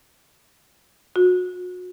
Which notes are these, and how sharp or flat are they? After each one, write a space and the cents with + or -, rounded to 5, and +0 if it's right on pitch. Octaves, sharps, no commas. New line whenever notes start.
F#4 -35